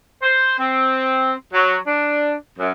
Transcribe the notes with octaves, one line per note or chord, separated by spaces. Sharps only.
C5
C4
F#3
D4
F#2